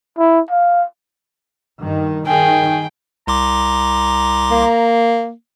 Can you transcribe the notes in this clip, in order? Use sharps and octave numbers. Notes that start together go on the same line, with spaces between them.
E4
F5
G2 D#3
D#3 G#4 G5
C2 A#5 C6 D6
A#3